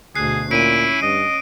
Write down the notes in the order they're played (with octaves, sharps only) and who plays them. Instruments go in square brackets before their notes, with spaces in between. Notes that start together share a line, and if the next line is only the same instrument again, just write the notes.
[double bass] D2 B2 [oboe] G#4 [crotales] F#6 C7
[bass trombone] A#2 [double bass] C#4 [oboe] E4 [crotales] D7 D#7
[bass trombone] G2 [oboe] D#5